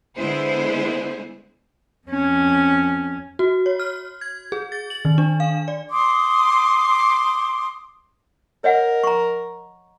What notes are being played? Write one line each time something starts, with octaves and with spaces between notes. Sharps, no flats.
D3 G#3 B3 E4 G#4 C5
F2 C#4
F#4
C#5
F6
G#6
G#4
A6
F#7
D#3
D4
F5
D5
C6 D6 D#6
A#4 C#5 D#5 F#5
A#5 C#6